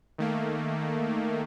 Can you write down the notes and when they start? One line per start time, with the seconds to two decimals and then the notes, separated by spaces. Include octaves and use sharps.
0.18 D#3 A3 A#3